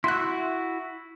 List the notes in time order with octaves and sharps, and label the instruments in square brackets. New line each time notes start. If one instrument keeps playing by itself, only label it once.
[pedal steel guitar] E4 F#4 E5 [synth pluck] C6 F#6